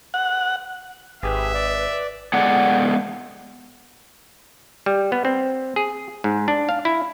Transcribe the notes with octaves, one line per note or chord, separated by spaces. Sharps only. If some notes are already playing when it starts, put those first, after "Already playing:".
F#5
G#1 G4 G#4 B4 E5
D5
G#3 B3 G#4 A4 D5 F#5
G3
B3
C4
G#4
G#2
D4
F5
E4